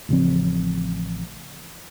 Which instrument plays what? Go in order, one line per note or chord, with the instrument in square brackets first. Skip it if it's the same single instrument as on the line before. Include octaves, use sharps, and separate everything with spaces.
[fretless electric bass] A1 C#3 F3 C4